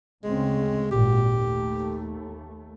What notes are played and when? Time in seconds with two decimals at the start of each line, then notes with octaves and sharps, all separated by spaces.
0.24 D2 C#3 G#3 C4
0.91 G#1 A#2 G4
1.29 D#2 A3